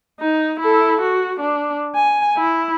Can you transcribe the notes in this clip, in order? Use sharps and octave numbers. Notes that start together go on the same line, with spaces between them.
D#4
E4 A4
F#4
D4
G#5
E4